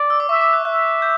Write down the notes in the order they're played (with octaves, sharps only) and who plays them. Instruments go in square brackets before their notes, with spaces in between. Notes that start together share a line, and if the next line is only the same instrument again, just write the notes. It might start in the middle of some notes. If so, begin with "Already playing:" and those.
Already playing: [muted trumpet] D5
[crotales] E6
D6
[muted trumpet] E5 [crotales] C#6
[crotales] D6
F#6
[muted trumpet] E5 [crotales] F#6
[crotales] G6